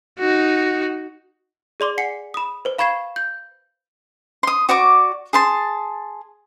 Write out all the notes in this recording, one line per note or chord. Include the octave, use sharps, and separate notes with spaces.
D#4 F#4
G#4 D5 C6 D6
F#5 G#5 C7 C#7
B5 D#6
B4 C5
F5 B5 C#6 G#6 C7 E7
G6
C6 D#6
F#4 D5 C#6 D6
G#4 A5 C6